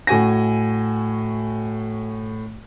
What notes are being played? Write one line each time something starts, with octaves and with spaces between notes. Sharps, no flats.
A2 F#4 G#5 A#6